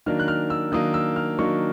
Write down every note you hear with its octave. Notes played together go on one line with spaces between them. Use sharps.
D#3 F#3 A#3 D4 F6
F#6
F6
E6
D#3 F#3 A#3 D4 D#6
E6
F6
D#3 F#3 A#3 D4 C#6